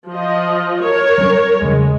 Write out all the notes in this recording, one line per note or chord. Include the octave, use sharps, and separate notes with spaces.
F3 D#5
A#4 C#5
F#3 G3 C#4
E2 C#3 G#3